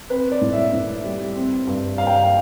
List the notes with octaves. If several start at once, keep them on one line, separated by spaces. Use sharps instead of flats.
C4 B4
D5
A2
E5
A2
G3
C4
G2
G2 F5
G5
F5